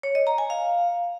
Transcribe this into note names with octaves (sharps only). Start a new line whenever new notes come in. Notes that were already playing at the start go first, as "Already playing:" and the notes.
C#5
D#5
A#5
G#5
F5